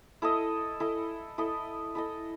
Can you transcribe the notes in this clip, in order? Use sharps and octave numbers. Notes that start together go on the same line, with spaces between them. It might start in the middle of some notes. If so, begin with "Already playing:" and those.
E4 A4 D#5
E4 A4 D#5
E4 A4 D#5
E4 A4 D#5